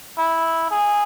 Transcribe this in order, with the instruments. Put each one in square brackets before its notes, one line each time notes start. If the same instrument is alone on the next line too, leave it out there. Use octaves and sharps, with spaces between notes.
[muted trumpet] E4
G#4